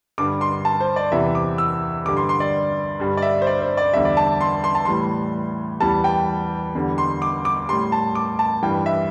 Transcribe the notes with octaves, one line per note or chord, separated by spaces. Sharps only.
G2 D3 G3 D6
C6
A5
C5
D5
E2 C3 E3 E5
D6
E6
G2 D3 G3 D6
C6
C6
D5
G2 D3 G3
D5
E5
C5
D5
C5
D5
E2 D3 G3 E5
D5
A5
C6
C6
A5
A2 E3 G3 C6
E2 E3 G3 A5
G5
E2 D3 G3
C6
D6
D6
A2 G3 C6
A5
D6
A5
G2 E3 G3 G5
E5